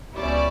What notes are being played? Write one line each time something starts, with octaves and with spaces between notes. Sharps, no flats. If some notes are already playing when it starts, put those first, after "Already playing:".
C#2 B2 G3 C#4 E4 D5